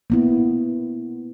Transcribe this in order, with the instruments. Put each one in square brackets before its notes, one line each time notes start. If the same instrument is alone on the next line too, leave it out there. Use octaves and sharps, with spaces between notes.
[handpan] A#3 B3 E4